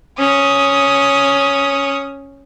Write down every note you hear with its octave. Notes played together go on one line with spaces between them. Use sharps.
C#4 D#6